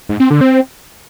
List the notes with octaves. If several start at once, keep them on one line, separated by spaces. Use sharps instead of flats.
G#2
C4
D3
C4